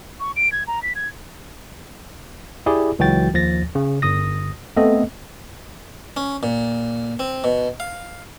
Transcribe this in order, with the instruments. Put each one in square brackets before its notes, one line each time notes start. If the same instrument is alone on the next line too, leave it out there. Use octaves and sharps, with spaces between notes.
[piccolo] C#6
D7
G#6
A#5
B6
G#6
[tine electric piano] E4 G4 G#4 D5
C#2 E3 F#3 F#4 G5 A6
D#2 F3 A6 A#6
C#3
G1 D#6 A#6
A3 B3 C4 A4 D#5
[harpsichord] C#4
A#2
C4
B2
F5